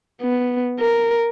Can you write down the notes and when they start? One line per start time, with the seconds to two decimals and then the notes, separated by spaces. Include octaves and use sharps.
0.21 B3
0.79 A#4